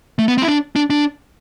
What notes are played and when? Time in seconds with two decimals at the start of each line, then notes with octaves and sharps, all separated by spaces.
0.19 A3
0.28 B3
0.38 C4
0.42 E4
0.48 D4
0.76 D4
0.90 D4